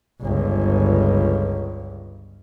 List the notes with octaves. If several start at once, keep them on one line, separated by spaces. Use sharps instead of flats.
G1 C#2